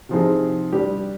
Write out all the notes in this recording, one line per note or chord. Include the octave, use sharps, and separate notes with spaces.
C3 F3 C4 D#4 G#4
G3 D4 G4